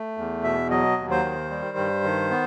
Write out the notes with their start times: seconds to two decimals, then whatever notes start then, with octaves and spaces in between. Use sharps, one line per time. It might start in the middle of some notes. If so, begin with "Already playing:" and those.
Already playing: A3
0.17 E2
0.44 B2 E5
0.70 F#3 D#5
0.98 D#2
1.11 C5
1.24 D#3
1.50 G3
1.77 G2
2.04 D#3
2.31 B3